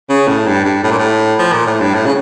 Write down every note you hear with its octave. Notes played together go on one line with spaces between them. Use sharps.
C#3
A2
G2
G2
A2
A#2
A2
F3
A#2
A2
G2
A2
C#3